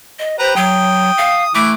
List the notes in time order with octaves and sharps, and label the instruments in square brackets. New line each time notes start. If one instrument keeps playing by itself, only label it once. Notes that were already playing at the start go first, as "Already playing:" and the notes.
[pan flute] D#5
[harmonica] G4 B4 A#5 [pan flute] C5
[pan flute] F#3 [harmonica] G5 D#6
[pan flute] F5
[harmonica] E3 D6 [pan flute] A3